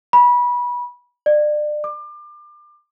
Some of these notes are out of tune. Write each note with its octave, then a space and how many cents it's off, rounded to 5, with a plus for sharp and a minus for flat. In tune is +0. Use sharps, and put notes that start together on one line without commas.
B5 -25
D5 +30
D6 +30